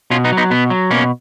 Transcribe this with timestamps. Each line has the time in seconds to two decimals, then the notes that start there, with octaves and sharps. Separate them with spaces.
0.10 B2 C#4 F4
0.24 B3 D#4
0.32 F#3
0.37 B3 D#4
0.50 B2 B3
0.70 F#3
0.90 B2 A#3 C#4